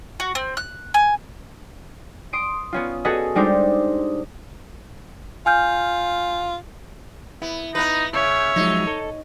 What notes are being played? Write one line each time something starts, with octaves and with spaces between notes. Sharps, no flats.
F#4
C4
F#6
G#5
C6 D#6 D7
B3 C#4 F4
F#4 G#4 A4 B4 D#5
G3 G#3 D4 D#4 C5
F4 G#5 F6 G6
B3 E4
B3 D#4 B4
C#3 C#5 E5
F3 F#3 G#3 D#4
A4